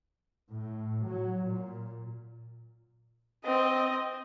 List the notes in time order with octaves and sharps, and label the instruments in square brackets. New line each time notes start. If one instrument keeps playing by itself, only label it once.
[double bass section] A2
F#3
A#2
[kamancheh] C4 D#5